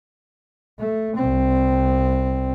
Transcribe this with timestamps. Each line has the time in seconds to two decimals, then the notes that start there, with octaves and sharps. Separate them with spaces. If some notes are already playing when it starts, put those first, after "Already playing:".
0.79 A3
1.16 C2 C4